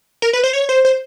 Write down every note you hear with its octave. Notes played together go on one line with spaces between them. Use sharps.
A#4
B4
C5
C#5
C5
C5